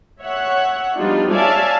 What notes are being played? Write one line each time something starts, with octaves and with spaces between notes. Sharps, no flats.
C#5 E5 F#5
F3 G3 B3 D4 D#4 F4
C#5 D5 E5 F5 G#5 A5